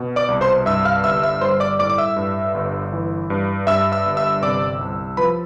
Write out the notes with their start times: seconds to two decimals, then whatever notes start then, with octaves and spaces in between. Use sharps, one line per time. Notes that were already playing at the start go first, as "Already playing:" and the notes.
Already playing: B2
0.16 D5 D6
0.28 C2
0.41 C5 C6
0.66 G2 E5 E6
0.85 F5 F6
1.04 G1 E5 E6
1.23 E5 E6
1.41 G3 C5 C6
1.60 D5 D6
1.79 A2 D5 D6
1.90 D6
1.98 E5 E6
2.16 G2
2.54 G1
2.93 E3
3.30 G2
3.67 G2 E5 E6
3.92 E5 E6
4.06 G1
4.17 E5 E6
4.43 C3 D5 D6
4.81 C2
5.17 F3 B4 B5